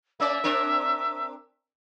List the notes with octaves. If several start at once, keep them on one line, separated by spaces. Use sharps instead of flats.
A#3 C#4 D5 E5
C4 D4 A#4